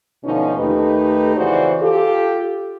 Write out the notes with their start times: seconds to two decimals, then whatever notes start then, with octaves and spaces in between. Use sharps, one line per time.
0.25 B2 D3 F3 C#4 D#4 F4
0.57 D#2 A3 D#4 G4 A4 B4
1.36 F2 C#3 E3 F#4 C5 D5
1.81 F4 G4 A4